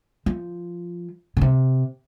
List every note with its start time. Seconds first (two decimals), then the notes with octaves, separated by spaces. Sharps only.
0.26 F3
1.37 C#3
1.41 C3